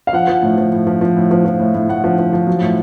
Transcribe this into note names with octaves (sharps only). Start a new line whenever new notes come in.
F5
F3 F#5
F3
A2
F3
A2
F3
F3
A2
F3
F3
A2
A2
A2 F#5
F3
F3
F3
F#3
A2